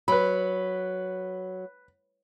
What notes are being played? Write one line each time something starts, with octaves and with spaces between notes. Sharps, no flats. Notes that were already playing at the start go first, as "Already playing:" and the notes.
F#3 B4 B5